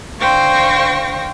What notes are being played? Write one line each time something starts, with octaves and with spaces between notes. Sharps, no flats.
D3 C5 F5 G5 C#6 A#6